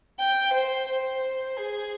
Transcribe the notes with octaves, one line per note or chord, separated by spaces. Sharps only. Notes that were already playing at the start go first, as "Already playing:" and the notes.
G5
C5
C5
G#4